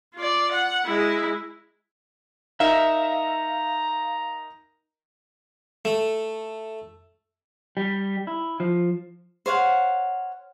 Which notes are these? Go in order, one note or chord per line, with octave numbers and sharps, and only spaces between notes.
F4 D5
F#5
G#3 E4
D#4 A#4 E5 F5 A#5
A3
G3
E4
F3
C5 C#5 F5 F#5